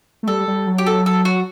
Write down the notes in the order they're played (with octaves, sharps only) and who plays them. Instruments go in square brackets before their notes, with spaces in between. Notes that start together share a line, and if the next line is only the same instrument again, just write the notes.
[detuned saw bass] A3
[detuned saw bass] G3 [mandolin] A4
[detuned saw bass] G3
F#3
[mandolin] G4
A4
A4
F#4